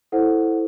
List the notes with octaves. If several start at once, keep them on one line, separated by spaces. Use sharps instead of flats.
E4 A4 C5 F#5